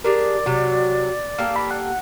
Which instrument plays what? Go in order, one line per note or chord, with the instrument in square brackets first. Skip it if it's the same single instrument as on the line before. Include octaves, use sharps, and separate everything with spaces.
[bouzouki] D4 G4 G#4 [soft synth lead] A#4 [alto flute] D5
[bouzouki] C3 F#3 [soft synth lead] F#4
[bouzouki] A#3 G4 A4 [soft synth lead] F5
[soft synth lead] B5
F#5